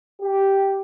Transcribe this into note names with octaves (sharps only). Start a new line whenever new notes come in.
G4